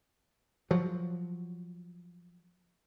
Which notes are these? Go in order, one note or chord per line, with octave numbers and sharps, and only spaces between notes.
F3 F#3